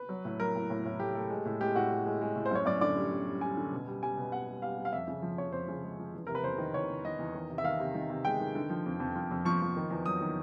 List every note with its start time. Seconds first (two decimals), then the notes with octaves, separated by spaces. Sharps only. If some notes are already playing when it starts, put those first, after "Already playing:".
Already playing: B4
0.09 F#3
0.25 A2
0.40 F#3 A#4
0.55 A2
0.70 A2
0.85 A2
1.00 A3 G4
1.15 A3
1.30 G#3
1.45 A2
1.61 G#3 G4
1.75 A2 F#4
1.90 G#3
2.06 G#3
2.21 G#3
2.36 A2
2.46 C5
2.51 F#2 C#5
2.66 F#2 D5
2.81 D3 D5
2.96 G3
3.11 G3
3.27 G3
3.41 G3 G#5
3.57 D3
3.72 B2
3.87 G3
4.02 G3 G#5
4.17 B2
4.32 G3 F#5
4.48 G3
4.62 G3 F5
4.77 G3
4.85 F5
4.93 F2 E5
5.08 C#3
5.22 F3
5.38 F2 C#5
5.53 F2 C5
5.68 C#3
5.83 G#3
5.99 F3
6.14 E2
6.27 C3 A#4
6.35 B4
6.43 E2 C5
6.58 D#3
6.74 E2 C#5
6.89 E2
7.04 D#3 D#5
7.19 E2
7.34 D#3
7.50 C3
7.58 E5
7.64 D#3 F5
7.80 C3
7.94 D#3
8.10 C3
8.25 G#3 G5
8.40 D#3
8.55 D3
8.70 F3
8.86 F2
9.00 F2
9.16 F3
9.31 F2
9.45 F3 C#6
9.61 F3
9.77 D#3
9.90 E2
10.06 F#3 D#6
10.21 D#3